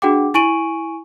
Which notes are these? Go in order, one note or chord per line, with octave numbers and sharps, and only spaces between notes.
D4 F#4 G#4 F#5 G5 D6
E4 G#5 C#6 D7 D#7 F#7